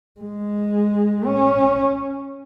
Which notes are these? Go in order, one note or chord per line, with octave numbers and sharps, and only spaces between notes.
G#3
C#4